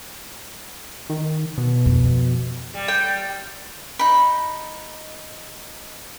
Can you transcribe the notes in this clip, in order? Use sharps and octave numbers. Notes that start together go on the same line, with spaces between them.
D#3
B2
F2
G3
G5
D#4 B5